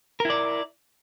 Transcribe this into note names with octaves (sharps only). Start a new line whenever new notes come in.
E4 A#4 D5